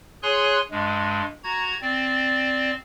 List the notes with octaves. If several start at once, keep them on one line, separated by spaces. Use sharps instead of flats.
G#4 C#5 G#5 C6 F#6
G2 G#3
F#4 A#5 G#6
C4 D5